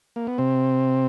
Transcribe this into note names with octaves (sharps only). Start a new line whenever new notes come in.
A#3
B3
C3 C4